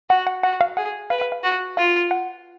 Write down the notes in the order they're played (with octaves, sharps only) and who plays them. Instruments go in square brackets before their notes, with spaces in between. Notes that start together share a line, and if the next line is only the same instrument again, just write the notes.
[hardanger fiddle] F#4 [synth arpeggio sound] F#5
[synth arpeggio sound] F#5
[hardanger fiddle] F#4 [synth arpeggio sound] F#5
[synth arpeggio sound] F5
[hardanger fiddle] G#4 [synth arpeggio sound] F#5
[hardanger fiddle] B4 [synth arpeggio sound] F5
[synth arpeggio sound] F5
F5
[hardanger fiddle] F#4
[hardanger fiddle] F4 [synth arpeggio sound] F5
[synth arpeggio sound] F#5